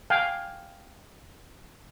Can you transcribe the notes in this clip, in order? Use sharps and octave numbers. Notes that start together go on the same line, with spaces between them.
F5 G5 G#5